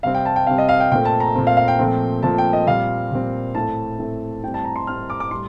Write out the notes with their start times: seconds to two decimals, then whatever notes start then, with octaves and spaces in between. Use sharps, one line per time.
0.03 C3 G3 C4 F5
0.15 G5
0.25 A5
0.36 G5
0.47 C3 G3 C4 F5
0.58 D#5
0.69 F5
0.80 G5
0.92 A#2 A3 C4 G5
1.05 A5
1.20 A#5
1.35 A#2 A3 C4
1.47 F5
1.57 F5
1.68 G5
1.79 A#2 F3 A3 C4
2.23 A#2 F3 A3 C4 A5
2.38 G5
2.53 D#5
2.67 A#2 G3 C4 F5
3.12 A#2 G3 C4
3.55 A2 A3 C4 A5
3.99 A2 A3 C4
4.43 A2 G3 C4 G5
4.54 A5
4.65 A#5
4.76 C6
4.87 A2 G3 C4 F6
5.10 D6
5.20 D6
5.31 A2 G3 C6